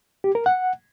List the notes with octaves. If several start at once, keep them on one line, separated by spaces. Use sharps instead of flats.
G4
A#4
F#5